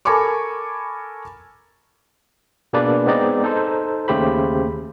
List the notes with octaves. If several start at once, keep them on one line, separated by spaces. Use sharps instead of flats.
A4 A#4 G#5 B5 C#6 D6
B2 A#3 D4 G#4 B4 D5
G#3 B3 C4 D#4 D5 D#5
D#4 A4 C5
D#2 C#3 A3 G4 C5 B5